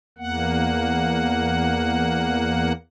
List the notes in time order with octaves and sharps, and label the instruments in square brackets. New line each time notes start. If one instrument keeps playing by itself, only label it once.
[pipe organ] E2 A#3 F#5